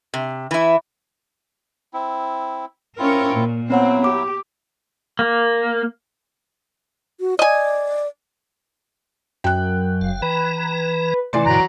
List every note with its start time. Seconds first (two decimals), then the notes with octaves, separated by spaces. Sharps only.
0.14 C3
0.51 E3 E4
1.94 C4 E4
2.99 C4 C#4 E4 F4 A#4 C#5
3.34 A#2
3.70 F#3 B3 C4 E4 C#5 F#5
4.04 G4 D6
5.19 A#3
7.20 F#4
7.39 D5 D#5 G#5
9.44 F#2 G5 F#6
10.01 F#1 F5
10.22 E3 B4 A#5
11.33 C3 E3 A3 D5 C6
11.46 G2 B2 D3 F#3 A#5